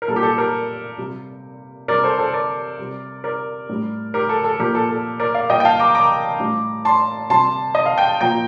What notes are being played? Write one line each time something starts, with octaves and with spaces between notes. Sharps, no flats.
A#4
A#2 G3 A4
G4
A4
G4 A#4
C3 G3
C3 G3 A#4 D5
A4 C5
A4 C5
A#4 D5
C3 G3
A#4 D5
A2 G3
G4 A#4
A4
A4
A#2 F3 G4 A#4
A4
A4
A#4 D5
D5 F5
A#2 G3 D#5 G5
G5
F5 A5
A#5 D6
A#5 D6
A2 G3
A5 C6
C3 G3 A5 C6
D#5
F5
G5
A5
A#2 F3 G5 A#5